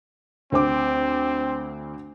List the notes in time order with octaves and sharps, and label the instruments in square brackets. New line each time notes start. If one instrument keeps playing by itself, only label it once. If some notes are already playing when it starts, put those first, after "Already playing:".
[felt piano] D2 C5 D6 [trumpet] C4